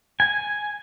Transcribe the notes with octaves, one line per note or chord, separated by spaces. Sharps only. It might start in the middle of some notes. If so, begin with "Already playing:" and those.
G#5